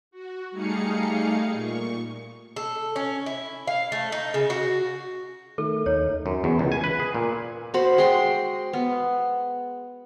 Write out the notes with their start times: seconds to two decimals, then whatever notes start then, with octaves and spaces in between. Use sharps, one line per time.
0.11 F#4
0.51 G3 A3 D#4 G#4 F5 C#7
1.52 A#2 C#6
2.56 A4
2.96 C#4
3.26 E4
3.67 F5
3.92 A3
4.12 D#4
4.34 C#3
4.50 F#4
5.58 D#3 A3 A4
5.86 D#2 D#4 C#5
6.26 F#2
6.44 E2
6.59 C#2
6.72 G#5
6.84 B4
7.00 G#4
7.15 A#2
7.74 F#4 C5 B5
7.98 G#3 G5 C6
8.73 B3